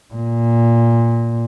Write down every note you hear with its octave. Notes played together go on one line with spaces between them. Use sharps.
A#2